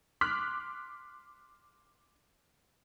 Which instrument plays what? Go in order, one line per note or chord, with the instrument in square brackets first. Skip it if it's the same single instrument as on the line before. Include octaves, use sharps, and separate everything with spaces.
[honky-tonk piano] C6 D6 F6 F#6 B6